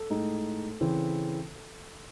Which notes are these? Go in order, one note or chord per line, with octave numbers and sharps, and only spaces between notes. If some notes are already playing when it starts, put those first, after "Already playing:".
Already playing: A4
A2 G#3 D#4
C#3 E3 C4